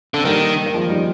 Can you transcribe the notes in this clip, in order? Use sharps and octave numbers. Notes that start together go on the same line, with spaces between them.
D3 C4
D#3 G3 A#3
A#3
F3 G#3
D#3 G3